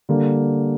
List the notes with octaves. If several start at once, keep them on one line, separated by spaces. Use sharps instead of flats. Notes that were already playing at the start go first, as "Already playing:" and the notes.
D3 G3 A#3